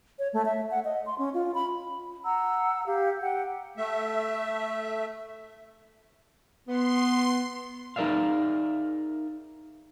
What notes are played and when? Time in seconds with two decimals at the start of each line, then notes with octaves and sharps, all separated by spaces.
0.19 C#5
0.33 A3
0.45 E5
0.71 F#5
0.85 D#5
1.06 C6
1.18 C#4
1.34 F4
1.54 B5
2.24 F#5 A#5 E6
2.86 G4 F5
3.20 F#5 G5
3.77 A3 E5
6.68 B3 C6
7.96 D#4 G#4 A#4 D5 E5 F5